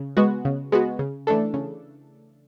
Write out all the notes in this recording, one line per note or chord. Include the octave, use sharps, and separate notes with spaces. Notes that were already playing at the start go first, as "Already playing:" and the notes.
Already playing: C#3
G#3 B3 F#4
C#3
G#3 B3 F#4
C#3
E3 A3 D4 A4
C#3